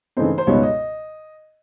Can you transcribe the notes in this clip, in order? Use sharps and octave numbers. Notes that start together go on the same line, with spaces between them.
C#3 E3 A3 C4 D#4 C5
C5
C#2 B2 G3 B3 D#4 C#5
D#5